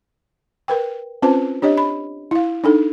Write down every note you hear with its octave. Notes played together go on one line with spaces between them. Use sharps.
A#4 B4 G5
C4 C#4 F4 B4 C5 A5
D4 G4 C#5 D#5
B5
E4 F5
D4 D#4 A4